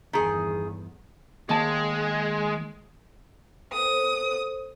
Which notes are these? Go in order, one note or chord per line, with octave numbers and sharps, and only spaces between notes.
G1 E2 D#3 G#4
D#2 G#3 A5
A4 C5 D#6